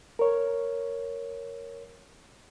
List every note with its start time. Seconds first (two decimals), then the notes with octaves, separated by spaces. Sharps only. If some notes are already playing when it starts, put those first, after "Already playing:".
0.19 A#4 C#5